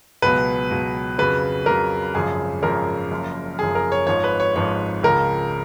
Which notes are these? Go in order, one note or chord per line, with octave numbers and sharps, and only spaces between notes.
C#2 B2 F#3 B4
C#2 B2 F#3
F2 C#3 F#3 B4
F2 C#3 F#3 A#4
G#1 F#2 C#3 F3 G#4
G#1 F#2 C#3 F3 A#4
F#1 F#2 F3
F#1 F#2 F3 G#4
A#4
C#5
G#1 G#2 F3 C#5
B4
C#5
G#1 G#2 F3 C#5
C#2 C#3 F3 A#4